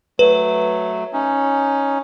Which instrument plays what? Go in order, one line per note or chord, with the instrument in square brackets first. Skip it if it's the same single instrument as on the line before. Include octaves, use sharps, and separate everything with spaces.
[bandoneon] F#3 A3 [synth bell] B4
[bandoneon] C#4 D#4